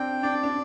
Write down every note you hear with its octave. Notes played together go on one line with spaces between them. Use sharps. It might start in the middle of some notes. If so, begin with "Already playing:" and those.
Already playing: C4 D4 G5
D4 D5
D4